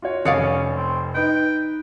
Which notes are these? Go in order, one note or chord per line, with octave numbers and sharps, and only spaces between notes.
F4 F#4 C#5
F1 C#4 C#5 D5 F5 D#6 C#7
C4
D#4 B4 G5